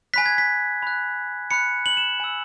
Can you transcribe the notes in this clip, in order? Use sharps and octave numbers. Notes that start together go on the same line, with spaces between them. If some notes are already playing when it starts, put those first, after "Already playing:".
G#5 B5 F#6 B6
G#6
B6
B5 F#6
B5 F#6 C#7
F#7
E7
G#5 E6